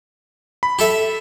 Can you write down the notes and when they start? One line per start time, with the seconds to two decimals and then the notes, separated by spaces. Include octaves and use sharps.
0.63 B5
0.79 G4 A4 E5